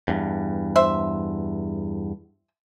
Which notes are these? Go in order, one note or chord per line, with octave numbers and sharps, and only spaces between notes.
E2 G2
C5 E5